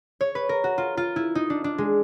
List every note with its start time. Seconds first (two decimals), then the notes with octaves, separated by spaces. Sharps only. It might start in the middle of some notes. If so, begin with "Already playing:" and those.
0.21 C#5
0.35 B4
0.49 A#4
0.64 F#4
0.78 F4
0.97 F4
1.16 E4
1.35 D#4
1.50 D4
1.64 D4
1.78 G#3